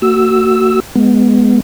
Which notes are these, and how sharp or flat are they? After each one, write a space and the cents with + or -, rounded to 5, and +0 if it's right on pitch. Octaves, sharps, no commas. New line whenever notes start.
A#3 -45 F#4 +15 E6 +0
G#3 +0 B3 -5